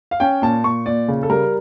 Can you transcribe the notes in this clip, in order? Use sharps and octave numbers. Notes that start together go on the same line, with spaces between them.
F5
C#4 G5
A#2 A5
A#2 C#6
A#2 D5
C#3
A4
G3 A#4